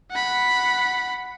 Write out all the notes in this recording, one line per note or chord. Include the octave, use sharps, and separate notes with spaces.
F#5 B5